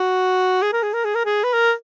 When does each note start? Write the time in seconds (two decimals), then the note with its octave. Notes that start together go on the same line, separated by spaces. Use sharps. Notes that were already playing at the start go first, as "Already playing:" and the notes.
Already playing: F#4
0.62 G#4
0.73 A#4
0.83 G#4
0.94 A#4
1.05 G#4
1.15 A#4
1.25 G#4
1.44 B4
1.53 A#4